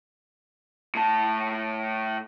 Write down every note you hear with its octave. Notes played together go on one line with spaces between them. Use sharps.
A2 A5